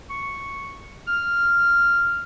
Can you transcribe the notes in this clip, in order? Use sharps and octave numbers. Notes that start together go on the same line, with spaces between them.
C#6
F6